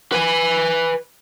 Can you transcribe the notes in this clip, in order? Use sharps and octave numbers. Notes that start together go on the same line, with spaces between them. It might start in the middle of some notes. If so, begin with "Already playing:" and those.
B4 G#5